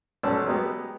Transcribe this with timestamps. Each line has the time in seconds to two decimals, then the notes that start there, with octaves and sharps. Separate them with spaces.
0.23 B1 C#4 D5 A5 E6
0.46 F#3 G#3 B3 G4